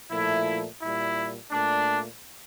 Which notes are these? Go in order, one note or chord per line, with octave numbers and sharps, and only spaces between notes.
A#2 F3 A3 E4
A#2 G3 E4
A#2 A3 D4